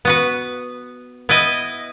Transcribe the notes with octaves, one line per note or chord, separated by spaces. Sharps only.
B3 F#4 B4
B3 E4 B4 D#5